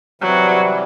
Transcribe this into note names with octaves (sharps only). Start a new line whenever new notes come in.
C3 E3 F#3 G3